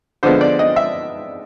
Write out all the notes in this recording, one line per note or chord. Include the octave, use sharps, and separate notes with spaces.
D3 F3 G#3 B3 C5
D5
D#5
E5